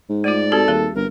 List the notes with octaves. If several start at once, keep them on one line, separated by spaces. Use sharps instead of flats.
G#2
A3 F4 D5
C4 F#4 G4 A4
D#2 G3 G#4
G1 A#4